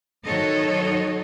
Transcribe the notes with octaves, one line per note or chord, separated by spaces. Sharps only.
D#3 F#3 F#4 A4 C#5 D#5